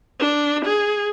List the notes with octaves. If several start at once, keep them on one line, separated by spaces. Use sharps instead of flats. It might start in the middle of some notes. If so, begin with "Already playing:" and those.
D4
G#4